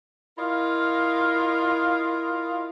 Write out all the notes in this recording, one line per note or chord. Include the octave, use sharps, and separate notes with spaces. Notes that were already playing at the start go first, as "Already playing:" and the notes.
E4 F4 A#4 D#5 F5